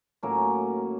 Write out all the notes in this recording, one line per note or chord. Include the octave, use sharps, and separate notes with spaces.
A2 F#3 A#3 C#4 A#4